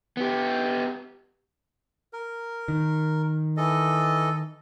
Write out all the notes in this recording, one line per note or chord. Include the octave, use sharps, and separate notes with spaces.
B3 G4
A#4
D#3
E3 A4 D#5